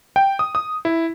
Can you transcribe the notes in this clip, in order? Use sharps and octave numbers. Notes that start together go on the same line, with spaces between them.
G5
D#6
D#6
E4